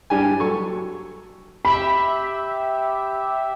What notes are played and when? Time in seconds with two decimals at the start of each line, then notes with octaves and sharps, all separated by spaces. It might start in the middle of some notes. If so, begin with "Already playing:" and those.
0.10 G2 D4 G4 G#5
0.40 F#3 A4 C#6
1.65 G4 E5 B5